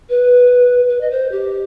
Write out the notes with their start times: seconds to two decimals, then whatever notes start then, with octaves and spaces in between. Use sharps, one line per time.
0.09 B4
0.89 B4
1.00 D#5
1.10 C5
1.31 G4